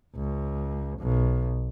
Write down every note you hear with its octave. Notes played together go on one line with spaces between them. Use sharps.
C#2
B1